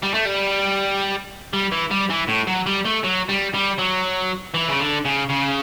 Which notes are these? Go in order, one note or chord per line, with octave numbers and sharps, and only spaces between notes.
G3
A3
G3
G3
E3
G3
E3
A2
F#3
G3
A3
F#3
G3
G3
F#3
E3
C#3
D3
C#3
C#3